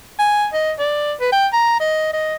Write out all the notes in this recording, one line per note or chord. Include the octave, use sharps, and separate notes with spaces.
G#5
D#5
D5
B4
G5
A#5
D#5
D#5